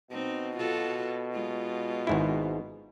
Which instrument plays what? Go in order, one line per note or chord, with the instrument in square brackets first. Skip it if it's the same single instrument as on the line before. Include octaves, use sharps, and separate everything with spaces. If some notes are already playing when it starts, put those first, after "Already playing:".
[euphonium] B2 [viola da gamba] C4 D#4
[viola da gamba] F4 F#4 A4
G#3 F4
[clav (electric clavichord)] G#1 G#2 E4